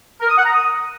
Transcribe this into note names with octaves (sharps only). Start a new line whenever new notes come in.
A#4
D#6
F#5
A#5
D#6